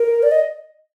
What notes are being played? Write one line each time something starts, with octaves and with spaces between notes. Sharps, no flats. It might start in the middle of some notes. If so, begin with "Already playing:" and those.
Already playing: A#4
D5
D#5